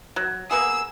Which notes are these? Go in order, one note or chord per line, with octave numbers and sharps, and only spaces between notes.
F#3
A#3 B3 G#4 E6